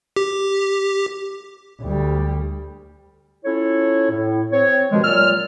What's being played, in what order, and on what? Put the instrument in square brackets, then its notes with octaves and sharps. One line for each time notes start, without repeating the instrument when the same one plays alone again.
[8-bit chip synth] G4
[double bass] D2 G3
[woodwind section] C#4 E4 F4 A4 C#5
A2
C4 C#5
G2 B2 D#3 F3 G#3
A#2 F#3 D5 E6 F6